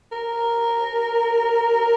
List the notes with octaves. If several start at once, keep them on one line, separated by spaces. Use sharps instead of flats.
A#4